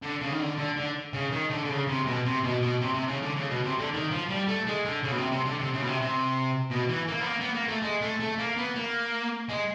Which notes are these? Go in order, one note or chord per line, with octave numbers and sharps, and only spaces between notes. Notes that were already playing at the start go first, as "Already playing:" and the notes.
D3
C#3
D#3
D3
D3
D3
C#3
D#3
D3
D3
C#3
C3
B2
C3
B2
B2
C3
C3
C#3
D3
C#3
B2
C3
D3
D#3
F3
G3
A3
G#3
D3
C#3
B2
C3
C3
D3
C3
C#3
B2
C3
C3
B2
E3
A#3
B3
A#3
B3
A#3
A3
G#3
A3
A3
A#3
B3
A#3
G#3